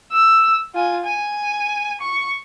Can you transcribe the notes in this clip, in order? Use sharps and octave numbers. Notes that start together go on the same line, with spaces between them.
E6
F4 G#5
G#5
C#6